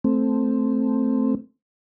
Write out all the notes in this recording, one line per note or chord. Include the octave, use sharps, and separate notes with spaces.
A3 C4